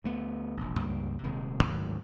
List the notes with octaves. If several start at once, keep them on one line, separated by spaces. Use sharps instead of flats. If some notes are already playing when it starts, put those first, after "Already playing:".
D2 A3 B3
E1 A#1
C#2 G2 G3 A#3
D#1 C3 D#3 G#3
D2 G#2 D#3 F#3